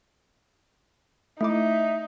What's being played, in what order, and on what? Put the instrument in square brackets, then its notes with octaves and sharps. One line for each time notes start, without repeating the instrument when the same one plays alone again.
[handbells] A3 E4 D6 [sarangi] D#4 [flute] E5